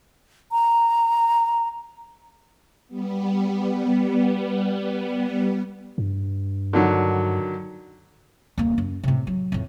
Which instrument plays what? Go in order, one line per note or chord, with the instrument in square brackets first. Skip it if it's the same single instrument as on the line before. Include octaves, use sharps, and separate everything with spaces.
[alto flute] A#5
[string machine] G3 B3
[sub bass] G2
[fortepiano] D3 D#3 F#3
[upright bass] D#1 A#3
F#2
A2 C3
F#3
F2 A2